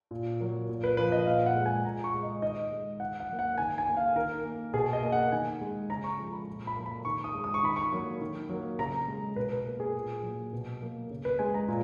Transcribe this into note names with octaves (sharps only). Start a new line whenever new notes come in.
A#2
F#3 A#3
A#2
B4
F3 A#3 B4
D#5
A#2 F5
F#5
G#3
G#5
A#2 A#5
C#6
G#3
D#5
D#3 D#5
G#3
D#3 F#5
F#5
F#3 A#3
F#5
D#3 G#5
G#5
A#3
F5
D#3 A#4
A#3
B2 G#4
D#5
A#3
F#5
D#3 G#5
G#3
C#3 A#5
C#6
F3 G#3
B5
A#2
B5
F#3 A#3
B5
D#3 C#6
D#6
G#3
D#6
C#6
D#3 B5
C#6
F#3 A#3
D#3
F#3 A#3
C#3 A#5
G#3
B2 B4
B4
A#3 A#4
G#4
A#2
F#3 A#3
B2
F#3 A#3
C#3
B4
G#3 G#5
A#5
A#2